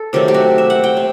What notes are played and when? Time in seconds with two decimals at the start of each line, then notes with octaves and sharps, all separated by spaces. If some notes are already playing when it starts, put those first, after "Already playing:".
Already playing: A4
0.13 C3 D#3 F#3 A3 G4
0.28 G4
0.34 F#4
0.58 E5
0.70 F#5
0.84 G5
0.97 C3